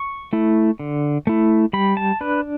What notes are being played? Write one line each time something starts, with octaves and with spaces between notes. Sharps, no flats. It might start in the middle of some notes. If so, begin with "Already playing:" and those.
Already playing: C#6
A3 E4
D3
A3 E4
G3 B5
A5
D4 B4